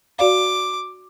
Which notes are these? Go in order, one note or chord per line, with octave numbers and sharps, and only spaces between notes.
F#4 D5 F5 D6